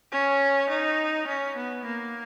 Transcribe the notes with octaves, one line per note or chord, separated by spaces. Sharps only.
C#4
D#4
C#4
B3
A#3